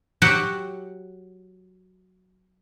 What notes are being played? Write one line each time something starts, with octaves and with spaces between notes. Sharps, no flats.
F#3 F#4 G4 F#5